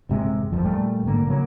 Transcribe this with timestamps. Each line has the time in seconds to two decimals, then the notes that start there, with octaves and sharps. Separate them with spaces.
0.09 A1 F#2 C3 G#3
0.52 G1 F2 F3
0.63 A#2 G3 A3
1.03 A1 G#2 D3 A#3
1.27 C#3 F#3 A#3